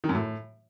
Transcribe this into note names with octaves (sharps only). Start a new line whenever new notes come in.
D#3
F#2
A2